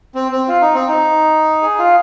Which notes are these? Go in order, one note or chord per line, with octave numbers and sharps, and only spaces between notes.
C4
C4
F4
D#4
C4
D#4
G#4
F4